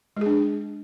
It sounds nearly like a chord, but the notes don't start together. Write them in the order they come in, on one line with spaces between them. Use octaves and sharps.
G#3 G#4 D4